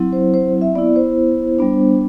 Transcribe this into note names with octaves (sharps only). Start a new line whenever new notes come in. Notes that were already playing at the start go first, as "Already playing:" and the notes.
Already playing: F#3 C4 E4
C5
C5
E5
B3 E4 D5
C5
G3 B3 D4